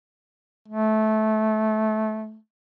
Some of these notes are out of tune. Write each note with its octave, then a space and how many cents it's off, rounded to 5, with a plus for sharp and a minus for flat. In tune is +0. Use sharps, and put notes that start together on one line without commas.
A3 -20